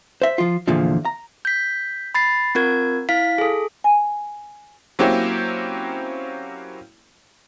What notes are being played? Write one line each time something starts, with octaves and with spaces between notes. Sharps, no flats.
C5 E5
F3 F4
E2 A#2 D3 F3
A#5
G6 B6
B5 A6 C7
C4 F4 A#4 G#6
E4 F5 B6
G#4 A4
G#5
F#3 A#3 C4 C#4 E4 G4